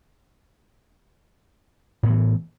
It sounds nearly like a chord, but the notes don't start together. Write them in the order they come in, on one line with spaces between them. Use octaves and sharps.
A2 B3 E3